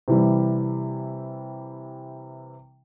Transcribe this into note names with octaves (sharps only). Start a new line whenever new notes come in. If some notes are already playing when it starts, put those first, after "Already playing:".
C3 E3 G3